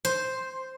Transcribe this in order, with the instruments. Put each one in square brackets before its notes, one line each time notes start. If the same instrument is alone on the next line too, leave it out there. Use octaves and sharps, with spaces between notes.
[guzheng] C5